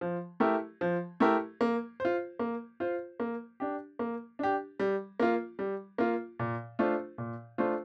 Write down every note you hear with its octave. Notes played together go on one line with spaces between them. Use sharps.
F3
A3 E4 G4 A#4
F3
A3 E4 G4 A#4
A#3
F4 C5
A#3
F4 C5
A#3
D4 G4
A#3
D4 G4
G3
A#3 F4
G3
A#3 F4
A#2
A3 D4 F4 C5
A#2
A3 D4 F4 C5